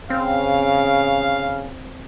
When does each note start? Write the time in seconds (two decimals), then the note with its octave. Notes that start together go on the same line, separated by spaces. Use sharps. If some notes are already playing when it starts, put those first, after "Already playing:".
0.10 C#3 C4 F5